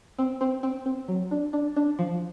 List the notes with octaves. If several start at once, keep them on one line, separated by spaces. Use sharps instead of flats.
C4
C4
C4
C4
F#3
D4
D4
D4
F3